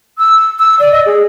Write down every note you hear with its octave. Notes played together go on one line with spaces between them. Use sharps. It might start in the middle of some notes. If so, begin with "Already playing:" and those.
E6
E6
D5
D#5
G#4